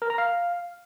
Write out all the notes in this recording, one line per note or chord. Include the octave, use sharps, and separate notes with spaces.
A#4
A#5
F5